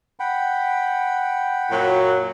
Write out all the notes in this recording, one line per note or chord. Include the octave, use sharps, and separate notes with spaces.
F#5 G5 B5
F#2 A#2 F#3